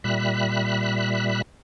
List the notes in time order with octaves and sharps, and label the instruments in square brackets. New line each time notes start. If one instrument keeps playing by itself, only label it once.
[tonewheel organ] A#2 G3 E5 B5 F#6